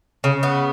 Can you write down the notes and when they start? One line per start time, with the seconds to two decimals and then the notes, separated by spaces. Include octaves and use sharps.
0.24 C#3
0.43 B3